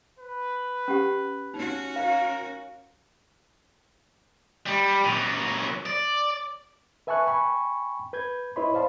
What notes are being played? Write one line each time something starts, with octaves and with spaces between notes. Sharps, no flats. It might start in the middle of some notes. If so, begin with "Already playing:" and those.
B4
C#4 G4 F#5
C#4 D#4 F#4
A#4 F5
G3
A#2 F#3
D5
B4 E5 G#5 A5 C#6 F#6
G5 G#5 B5 C#6
B4 G6 G#6
E4 B4 C#5 D#5 B5 C6
C5 D5 F5 A5 B5 C6